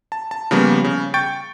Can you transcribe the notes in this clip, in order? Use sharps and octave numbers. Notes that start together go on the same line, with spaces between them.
A5
A5
C#3 F3 G3 A#3 B3
C#3
G5 C#6 G6 A6 D7